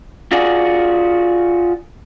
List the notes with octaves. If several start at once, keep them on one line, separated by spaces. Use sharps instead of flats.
F4 F#4 G#4 D5